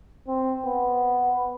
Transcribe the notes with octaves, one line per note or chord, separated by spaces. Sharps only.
C4
B3